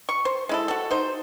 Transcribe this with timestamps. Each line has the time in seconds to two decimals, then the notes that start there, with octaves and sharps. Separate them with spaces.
0.09 C#6
0.25 C5
0.49 G#3 E4 A4
0.68 F#4 A4
0.91 D#4 C5